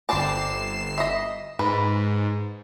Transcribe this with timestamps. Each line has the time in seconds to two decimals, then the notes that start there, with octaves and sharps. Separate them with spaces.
0.09 G1 C4 D4 A5 C7 E7
0.98 D#5 E5
1.59 G#2 B4